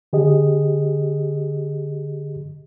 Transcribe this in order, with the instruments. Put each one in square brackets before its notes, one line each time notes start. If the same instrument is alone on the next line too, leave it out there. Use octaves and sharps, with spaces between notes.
[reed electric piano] D3 G4 G#4 D#5